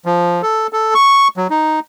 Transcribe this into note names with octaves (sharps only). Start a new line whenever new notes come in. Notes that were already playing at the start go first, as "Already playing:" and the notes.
F3
A4
A4
C#6
F#3
D#4